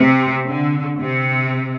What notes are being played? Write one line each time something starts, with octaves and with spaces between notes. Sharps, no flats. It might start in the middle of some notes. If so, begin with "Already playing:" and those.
Already playing: C3
D3
C3